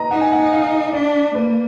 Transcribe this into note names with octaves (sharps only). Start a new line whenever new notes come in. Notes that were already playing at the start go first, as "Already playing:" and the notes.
Already playing: B4 D#5 A#5
D#4 F#5
G#5
F#5
F5
D4 D5
A#3 B4